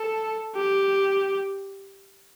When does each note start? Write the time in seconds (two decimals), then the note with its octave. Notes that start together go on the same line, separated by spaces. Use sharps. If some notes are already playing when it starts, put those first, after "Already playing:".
Already playing: A4
0.56 G4